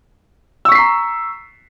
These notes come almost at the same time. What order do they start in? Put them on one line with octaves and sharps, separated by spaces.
E6 C#6 B6 C7 A#5